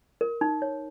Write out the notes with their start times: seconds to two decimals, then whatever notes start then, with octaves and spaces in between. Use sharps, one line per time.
0.21 A#4
0.41 D#4
0.62 C#5